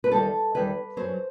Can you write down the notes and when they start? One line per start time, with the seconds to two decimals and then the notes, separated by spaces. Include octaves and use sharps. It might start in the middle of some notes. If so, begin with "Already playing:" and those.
0.04 B4
0.11 E2 D#3 G3 A4
0.55 E2 D#3 G3 B4
0.97 F#2 F#3 C5